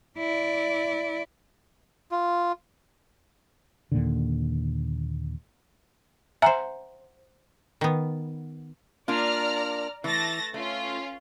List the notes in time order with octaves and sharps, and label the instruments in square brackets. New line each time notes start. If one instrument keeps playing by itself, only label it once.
[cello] E4 D5
[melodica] F4
[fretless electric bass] D#2 A#2 D3
[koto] C5 F#5 [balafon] E5 G#5 A#5
[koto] D#3 B3
[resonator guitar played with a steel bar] A#3 D4 F4 [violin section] D5 A#5 F6
[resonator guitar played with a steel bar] E3 [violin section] A3 A6 A#6
[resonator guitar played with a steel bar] A3 [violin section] C#4 F4